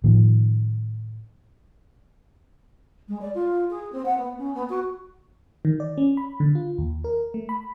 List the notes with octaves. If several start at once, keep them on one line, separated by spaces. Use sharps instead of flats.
A2 D#3 F3
G#3
D5
F4
G#4
C4
F#5
B3
C#4
B3
F#4
D#3
D5
C#4
B5
D3
F4
D#2
A#4
A3
B5